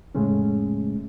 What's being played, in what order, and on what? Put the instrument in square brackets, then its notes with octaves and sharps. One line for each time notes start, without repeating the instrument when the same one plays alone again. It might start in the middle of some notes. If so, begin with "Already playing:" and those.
[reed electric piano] F2 A2 C#3 G#3 A3 C#4